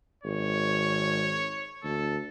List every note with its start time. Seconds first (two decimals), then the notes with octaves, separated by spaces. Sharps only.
0.24 G#1 C#5
1.83 D2 A4